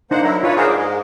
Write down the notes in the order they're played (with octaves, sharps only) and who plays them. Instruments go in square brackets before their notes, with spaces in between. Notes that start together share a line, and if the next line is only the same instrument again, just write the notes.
[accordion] A#3 C5 F#5 [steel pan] D4 D#4 D#5
[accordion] F#3 E4 [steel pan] A#4 F#5 A#5
[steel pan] F4 D#5 A5 [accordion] B4 C#5
[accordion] G#4 A#4 C5 [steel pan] D5 F5 F#5
[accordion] G#2 G#3 [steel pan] D6